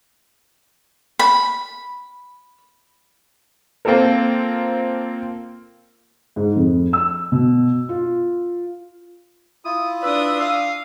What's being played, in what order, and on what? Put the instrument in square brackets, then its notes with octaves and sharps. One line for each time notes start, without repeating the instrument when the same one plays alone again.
[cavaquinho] B5
[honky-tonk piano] A#3 C4 F4 A4 A#4
[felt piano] G#2
F2
E6
B2
F4
[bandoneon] E4 F4 [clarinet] D#6
[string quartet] D4 D#6 [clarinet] B4 [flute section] E6
[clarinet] F5